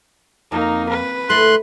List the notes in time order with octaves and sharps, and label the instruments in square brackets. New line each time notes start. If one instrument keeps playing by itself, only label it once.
[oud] F2 [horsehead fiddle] A#3 D#4
[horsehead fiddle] B4
[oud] D2 A3 E4 [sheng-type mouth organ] C6 F#6